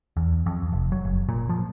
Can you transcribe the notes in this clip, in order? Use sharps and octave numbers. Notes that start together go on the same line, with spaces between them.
E2
F2
F1
F#3
F#1
A#2
F3